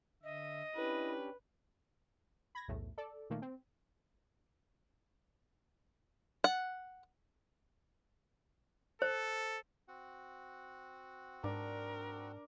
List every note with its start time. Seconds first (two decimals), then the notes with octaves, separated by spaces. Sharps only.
0.23 D3 D#5 E5
0.76 C#4 D4 E4 G4 B4
2.55 B5 G#6 A#6
2.68 B1 E2 A2 A3
2.98 A4 D5
3.30 A#2 D#3 A3 A#3
3.42 C4
6.44 F#5
9.02 A4 C5
9.88 C4 F#4 F#5
11.44 G#2 D4 A#4